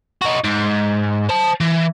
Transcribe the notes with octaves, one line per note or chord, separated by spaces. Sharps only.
D#4 F#4
G#2
C5 A5
E3